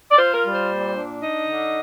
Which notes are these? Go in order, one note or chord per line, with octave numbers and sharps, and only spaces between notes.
D5
F4 C5
A#4
G3
C5
A#2
D4
D#4 D#5
D3